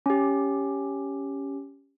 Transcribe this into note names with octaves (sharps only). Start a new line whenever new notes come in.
C#4 G4